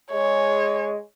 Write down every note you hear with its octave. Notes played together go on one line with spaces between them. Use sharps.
G#3 C#5